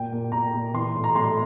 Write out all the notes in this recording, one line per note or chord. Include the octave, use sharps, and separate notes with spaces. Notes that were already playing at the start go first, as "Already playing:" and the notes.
Already playing: A#2 G5
A#2
A#2 A#5
A#2
E3 C6
A2
A#5
A2 C6